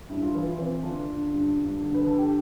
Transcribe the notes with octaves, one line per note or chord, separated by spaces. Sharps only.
G2 E4
F4
E3 E4
F4
E3 C4 E4
D3 D4 F4
D3
G2
G2
D3
B4
D3 A4
G4